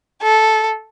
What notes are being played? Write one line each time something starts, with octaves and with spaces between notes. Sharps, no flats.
A4